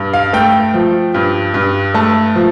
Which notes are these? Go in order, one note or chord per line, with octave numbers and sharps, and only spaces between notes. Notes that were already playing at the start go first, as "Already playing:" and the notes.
Already playing: G2
F5
A3 G5
F3
G2
G2
A3 A5
F3